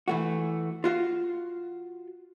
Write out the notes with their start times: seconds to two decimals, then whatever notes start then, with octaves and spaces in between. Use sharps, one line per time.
0.08 E3 A3 F#4
0.84 F4 F#4 F5